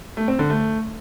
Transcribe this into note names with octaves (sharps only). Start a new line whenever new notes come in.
A3
C4
D3
A3